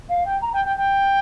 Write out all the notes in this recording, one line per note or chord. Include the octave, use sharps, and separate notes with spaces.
F5
G5
A#5
G5
G5
G5